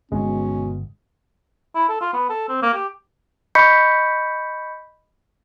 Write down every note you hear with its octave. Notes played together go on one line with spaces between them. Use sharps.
G1 B2 G#3 C#4
E4
A4
F4
B3
A4
C4
A#3
G4
D#5 B5 C#6 G6 B6 C#7